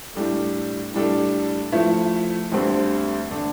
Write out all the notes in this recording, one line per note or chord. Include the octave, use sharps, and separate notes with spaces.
A2 G3 D4 A4
A2 G3 D4 A4
F3 A3 E4
D2 D3 G3 C4
D3 A3 D4 A4